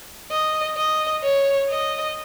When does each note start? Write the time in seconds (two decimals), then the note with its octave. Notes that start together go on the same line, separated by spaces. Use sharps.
0.31 D#5
0.77 D#5
1.23 C#5
1.70 D#5